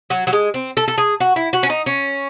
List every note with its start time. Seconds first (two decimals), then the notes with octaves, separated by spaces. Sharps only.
0.10 F#3
0.27 F#3
0.33 G#3
0.54 C4
0.77 A4
0.88 A4
0.98 G#4
1.20 F#4
1.36 E4
1.53 F#4
1.63 C#4
1.70 D#4
1.86 C#4